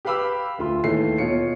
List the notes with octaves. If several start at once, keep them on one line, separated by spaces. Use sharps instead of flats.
G4 B4 F5 B5 D6 E6
D2 F4 C6
D#2 E3 A3 C7
B2 F4 C#5 C#7